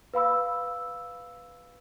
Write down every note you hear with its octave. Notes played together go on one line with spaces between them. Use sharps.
B4 F5 B5 E6